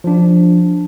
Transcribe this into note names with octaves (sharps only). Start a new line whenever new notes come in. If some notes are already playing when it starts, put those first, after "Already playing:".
F3 D4